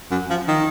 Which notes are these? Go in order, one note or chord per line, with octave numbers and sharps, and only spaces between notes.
F#2
F3
D#3